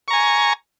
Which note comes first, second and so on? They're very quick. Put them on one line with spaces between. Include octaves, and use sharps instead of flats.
C#6 A#5 G#5